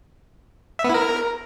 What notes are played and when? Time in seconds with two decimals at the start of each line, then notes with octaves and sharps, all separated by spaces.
0.79 E5
0.84 B3
0.89 E4
0.94 A#4